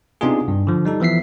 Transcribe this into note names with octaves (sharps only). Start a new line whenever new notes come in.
C3 B3 D4 D#4 F4 G#4
G2
D3 F3
G3 D#4 A4
E3 F3 B3 E5 B6 C7